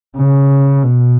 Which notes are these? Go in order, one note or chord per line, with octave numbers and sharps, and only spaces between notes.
C#3
B2